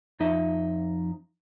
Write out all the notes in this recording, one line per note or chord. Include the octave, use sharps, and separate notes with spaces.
F2 F3 D#4 E5